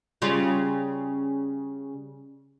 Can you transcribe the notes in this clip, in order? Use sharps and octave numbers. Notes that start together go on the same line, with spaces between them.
C#3 G3 F4